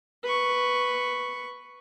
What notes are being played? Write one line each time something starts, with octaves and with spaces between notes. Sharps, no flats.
B4 C#6